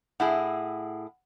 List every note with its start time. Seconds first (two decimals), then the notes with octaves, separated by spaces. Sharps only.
0.20 A2 E4 G#4 F#5